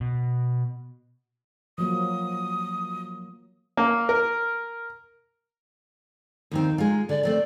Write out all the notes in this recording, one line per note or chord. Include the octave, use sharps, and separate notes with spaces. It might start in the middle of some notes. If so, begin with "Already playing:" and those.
B2
F3 F#3 A#3 D#6
A#3
A#4
D#2 D#3 C4 D#4
G#3 F4
D3 D5
A3 C4 A#4 D5